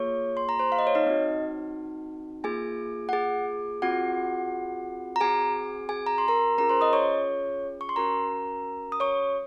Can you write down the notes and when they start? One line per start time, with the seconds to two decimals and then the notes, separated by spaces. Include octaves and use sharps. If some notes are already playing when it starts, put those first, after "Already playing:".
Already playing: A#3 F4 G#4 C#5 C#6
0.37 C6
0.49 A#5
0.59 C5 C6
0.72 F5
0.79 D#5
0.87 C#5
0.95 D#4 D#5
1.06 C4 D#4 F#4
2.44 A#3 F4 G#4 G#5
3.09 F#5
3.13 G#4 G#5
3.82 C4 F4 F#4 G#4 F#5
5.16 A#5
5.20 C4 F#4 G#4 G#5
5.89 G#4 G#5
6.06 A#5
6.18 C6
6.28 A#4 A#5
6.58 C#4 F4 G#4 A#4 A#5
6.69 C5 C6
6.81 D#5 D#6
6.93 C#5 C#6
7.81 C#6
7.89 C6
7.96 C#4 F#4 A#4 A#5
8.92 D#6
9.00 C#5 C#6